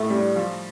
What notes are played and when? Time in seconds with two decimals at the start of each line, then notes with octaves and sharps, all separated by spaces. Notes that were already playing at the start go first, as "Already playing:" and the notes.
Already playing: A2 A3
0.10 G3 D4
0.36 F3